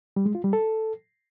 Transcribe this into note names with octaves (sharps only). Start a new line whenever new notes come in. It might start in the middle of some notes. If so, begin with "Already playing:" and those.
G3
G#3
F4
G3
A4